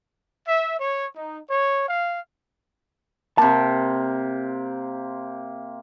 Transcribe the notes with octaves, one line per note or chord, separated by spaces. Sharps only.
E5
C#5
D#4
C#5
F5
C3 A#3 A5